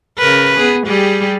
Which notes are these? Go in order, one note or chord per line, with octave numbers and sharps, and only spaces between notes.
C#3 A#4 B4
B3 G#4
G3 G4 G#4